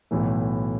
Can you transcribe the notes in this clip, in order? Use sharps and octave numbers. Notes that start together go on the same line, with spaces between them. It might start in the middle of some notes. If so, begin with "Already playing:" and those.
B1 A2 E3 A3